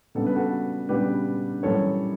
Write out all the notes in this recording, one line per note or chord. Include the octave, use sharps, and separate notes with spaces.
C#3 G3 B3 D4 A4
B4
F#4 A4
C#3 G3 B3 D4 G4 B4
F#2 E3 G3 A4 C#5